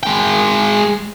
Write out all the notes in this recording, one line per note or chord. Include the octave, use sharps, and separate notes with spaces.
G#3 G5